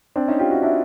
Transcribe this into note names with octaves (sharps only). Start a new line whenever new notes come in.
C4 D4
C#4 D#4
F4 G4
E4 F#4
D4 E4